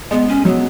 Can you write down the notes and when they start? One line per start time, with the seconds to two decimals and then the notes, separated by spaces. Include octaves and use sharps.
0.11 G#3 B3
0.29 C#4
0.45 F#3 B3